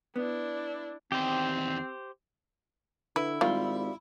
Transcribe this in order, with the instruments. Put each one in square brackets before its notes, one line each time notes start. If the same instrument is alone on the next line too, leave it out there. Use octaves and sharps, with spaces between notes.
[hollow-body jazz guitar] B3 [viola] D4 E4
[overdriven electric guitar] E2 D#3 [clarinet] C4 [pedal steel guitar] G4 C5
[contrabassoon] D3 [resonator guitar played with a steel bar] E4 [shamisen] B4
[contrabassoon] G#1 [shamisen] D#3 [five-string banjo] G3 F4